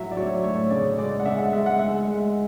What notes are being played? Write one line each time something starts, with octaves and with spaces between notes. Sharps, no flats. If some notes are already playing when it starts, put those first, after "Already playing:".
Already playing: A2 F#3 E5
D5
F#3 C#5
A2 C#5
C#3 D5
G#3 D5
F#5
C#3 E5
F#5
G#3 E5
F#5
G#3 E5
G#3